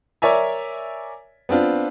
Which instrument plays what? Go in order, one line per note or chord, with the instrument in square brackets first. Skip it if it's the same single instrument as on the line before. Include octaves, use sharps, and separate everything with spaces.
[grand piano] A#4 C#5 D5 E5 G#5
B3 C4 D4 F4